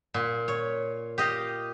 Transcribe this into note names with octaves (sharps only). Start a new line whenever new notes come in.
A#2
C#5
G4 D#5 F5